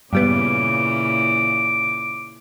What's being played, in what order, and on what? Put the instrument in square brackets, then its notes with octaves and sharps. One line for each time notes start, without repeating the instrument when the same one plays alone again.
[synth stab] G2 G3 B3 [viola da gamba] A#2 C#3 E3 [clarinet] D6